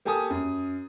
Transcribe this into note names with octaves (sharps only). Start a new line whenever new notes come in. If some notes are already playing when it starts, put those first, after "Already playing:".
A#3 G4 A4 G#5 A5 D#6
F#2